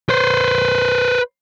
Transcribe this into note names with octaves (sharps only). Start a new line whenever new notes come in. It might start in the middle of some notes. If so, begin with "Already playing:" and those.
B4 C5